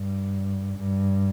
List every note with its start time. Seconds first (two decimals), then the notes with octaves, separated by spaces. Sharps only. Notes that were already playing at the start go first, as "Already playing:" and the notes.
Already playing: G2
0.78 G2